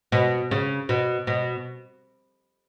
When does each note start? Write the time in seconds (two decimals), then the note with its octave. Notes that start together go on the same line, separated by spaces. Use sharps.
0.12 B2
0.51 C#3
0.89 B2
1.27 B2